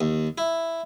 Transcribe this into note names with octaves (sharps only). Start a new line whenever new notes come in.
D#2
E4